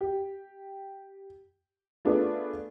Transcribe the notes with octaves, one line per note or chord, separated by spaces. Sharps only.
G4
A3 B3 D4 F4 G#4 B4